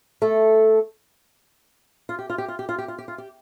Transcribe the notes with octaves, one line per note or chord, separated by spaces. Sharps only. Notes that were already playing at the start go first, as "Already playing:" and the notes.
A3 A4
F4
G4
F4
G4
F4
G4
F4
G4
F4
G4
F4
G4